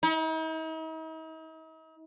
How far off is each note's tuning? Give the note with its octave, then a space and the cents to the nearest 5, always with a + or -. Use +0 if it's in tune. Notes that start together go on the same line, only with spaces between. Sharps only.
D#4 +45